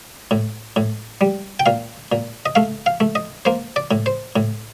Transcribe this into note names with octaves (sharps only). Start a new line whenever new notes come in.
A2
A2
G3
G5
A#2 F5
A#2
D#5
A3 F5
F5
A3
D#5
A#3 C5
D5
A2
C5
A2